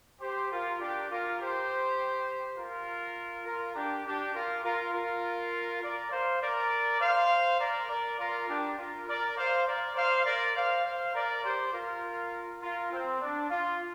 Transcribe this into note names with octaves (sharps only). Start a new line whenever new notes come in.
G4 C5
F4 A#4
D4 G4
F4 A#4
G4 C5
F4 A#4
F4 A#4
D4 G4
D4 G4
F4 A#4
F4 A#4
F4 A#4
A#4 D5
C5 F5
A#4 D5
C5 F5
A#4 D5
A#4 D5
F4 A#4
D4 G4
F4 A#4
A#4 D5
C5 F5
A#4 D5
C5 F5
A#4 D5
C5 F5
C5 F5
A#4 D5
G4 C5
F4 A#4
F4 A#4
C4
D4
F4